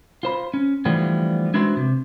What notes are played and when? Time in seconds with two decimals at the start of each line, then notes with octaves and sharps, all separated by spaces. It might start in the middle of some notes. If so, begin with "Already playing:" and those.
0.23 F4 C5 B5
0.54 C#4
0.85 D3 E3 F3 G3 A3 B3
1.54 G#3 D4 E4 F#4 B4 C5
1.77 C3